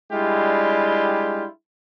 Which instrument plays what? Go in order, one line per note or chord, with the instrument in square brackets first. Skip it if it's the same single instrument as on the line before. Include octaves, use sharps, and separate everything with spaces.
[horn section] G3 G#3 D4 E4 F4 G4